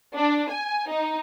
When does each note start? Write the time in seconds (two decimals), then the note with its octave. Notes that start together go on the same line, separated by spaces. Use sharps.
0.15 D4
0.50 G#5
0.89 D#4